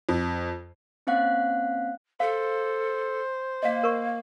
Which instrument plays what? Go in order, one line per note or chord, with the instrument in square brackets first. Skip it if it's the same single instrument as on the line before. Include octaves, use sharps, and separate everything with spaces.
[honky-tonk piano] F2
[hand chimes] A#3 C4 C#4 F5 F#5 F#6
[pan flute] A4 [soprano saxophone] C5 [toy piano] F5
[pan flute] A#3 [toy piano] D#5 F5
[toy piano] A#4 C#6